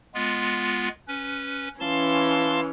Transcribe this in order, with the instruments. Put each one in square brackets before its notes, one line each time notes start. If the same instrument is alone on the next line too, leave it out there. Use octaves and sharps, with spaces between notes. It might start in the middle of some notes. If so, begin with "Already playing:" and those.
[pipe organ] G#3 B3 F4
C#4 B4
[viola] E3 C#4 [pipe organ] F5 A5 C6